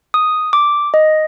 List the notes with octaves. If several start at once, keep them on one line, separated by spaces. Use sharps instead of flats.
D#6
D6
D#5